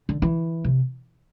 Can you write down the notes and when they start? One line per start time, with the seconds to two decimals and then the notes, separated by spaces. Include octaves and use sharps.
0.09 D3
0.22 E3
0.64 C3